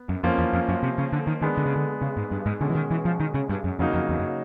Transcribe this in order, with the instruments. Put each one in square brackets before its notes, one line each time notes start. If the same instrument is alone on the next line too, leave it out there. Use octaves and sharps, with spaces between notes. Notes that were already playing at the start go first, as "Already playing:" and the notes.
Already playing: [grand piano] B3
[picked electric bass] F#2
[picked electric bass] F2 [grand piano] F3 A#3 C#4 F4
[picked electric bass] E2
F2
F#2
C3
C#3
D3
D#3
[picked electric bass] D#3 [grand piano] G#3 B3 D4
[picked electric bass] D3
C#3
D3
C#3
G#2
G2
G#2
[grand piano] B2 G#3 C#4 [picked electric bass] D3
[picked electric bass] E3
D#3
E3
F3
D#3
C#3
G2
F#2
[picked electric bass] F2 [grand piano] C#3 F#3 A#3 D#4
[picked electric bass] F2
E2
F#2